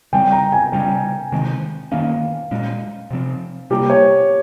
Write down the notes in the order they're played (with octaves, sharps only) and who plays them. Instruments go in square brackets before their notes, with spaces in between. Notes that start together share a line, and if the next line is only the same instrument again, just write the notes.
[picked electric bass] C#3 G3 C4 [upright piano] G5
[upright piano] A#5
G#5
[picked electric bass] C#3 G3 C#4 [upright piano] G5
[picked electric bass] C3 D#3 G#3 C4
[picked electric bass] D#3 A#3 C#4 [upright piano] F5
[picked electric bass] A#2 G#3 C#4
C3 F3 C4
[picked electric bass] C3 G3 A#3 [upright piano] G4
[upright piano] C#5